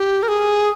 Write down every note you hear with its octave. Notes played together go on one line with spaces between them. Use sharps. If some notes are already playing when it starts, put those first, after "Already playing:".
Already playing: G4
A#4
G#4